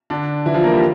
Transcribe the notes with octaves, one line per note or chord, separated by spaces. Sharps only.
D3 D4
E3 E4
F3 F4
A#3 A#4
G3 G4